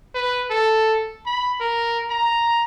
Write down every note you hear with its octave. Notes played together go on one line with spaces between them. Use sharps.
B4
A4
B5
A#4
A#5